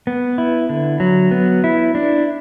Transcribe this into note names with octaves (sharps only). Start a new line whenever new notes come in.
B3
E4
D3
F#3
B3
E4
D4